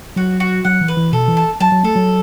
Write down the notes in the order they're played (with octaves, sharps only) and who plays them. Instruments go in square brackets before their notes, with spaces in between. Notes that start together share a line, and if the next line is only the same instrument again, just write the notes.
[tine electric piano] F#3 [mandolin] F#4
[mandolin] F#4
[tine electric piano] F#3 [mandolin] F#5
[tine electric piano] E3
[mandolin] B4
[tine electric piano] E3
[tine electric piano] B2 [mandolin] A4
[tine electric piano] E3
[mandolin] A5
[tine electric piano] F#3 [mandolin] A5
[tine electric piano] F#3
[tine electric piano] A3 [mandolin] A4
[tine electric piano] F#3